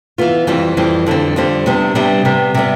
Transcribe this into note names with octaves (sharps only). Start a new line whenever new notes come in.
E3 B3 F4
F2 E3 G3 C4
F2 E3 G3 C4
F2 D3 G3 C4
F2 D3 G3 C4
C3 G3 B3 D4
C3 G3 B3 D4
C3 G3 B3
C3 G3 B3